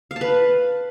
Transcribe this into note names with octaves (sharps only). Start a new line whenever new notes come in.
F5
A5
B4